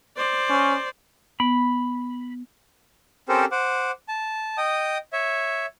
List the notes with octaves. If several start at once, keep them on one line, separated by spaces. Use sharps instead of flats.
C5 D5
C#4
B3 B5
C4 C#4 G4 A4 A#4 C5
C5 F#5 D6
A5
D#5 G5 D#6
C#5 E5